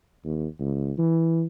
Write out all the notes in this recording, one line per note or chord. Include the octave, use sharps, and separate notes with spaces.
D#2
C#2
E3